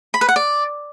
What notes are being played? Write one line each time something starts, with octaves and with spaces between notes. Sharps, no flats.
B5
B4
F#5
D5